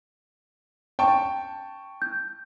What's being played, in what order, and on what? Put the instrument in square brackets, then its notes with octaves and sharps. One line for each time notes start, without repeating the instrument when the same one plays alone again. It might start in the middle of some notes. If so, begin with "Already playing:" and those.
[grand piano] G5 A5 C#6
[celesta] G6